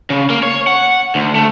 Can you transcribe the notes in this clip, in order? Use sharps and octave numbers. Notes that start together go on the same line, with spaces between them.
C#3
A#3
C#5
F#5
D2
A3